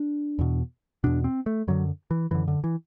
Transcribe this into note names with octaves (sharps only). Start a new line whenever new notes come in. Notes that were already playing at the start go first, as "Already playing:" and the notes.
Already playing: D4
E2 B2
E2 B2 D4
C4
A3
F#2 D3 F#3
E3
F#2 D3 E3
D3
E3